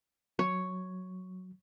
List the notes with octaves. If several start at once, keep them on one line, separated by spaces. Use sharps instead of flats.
F#3 C#5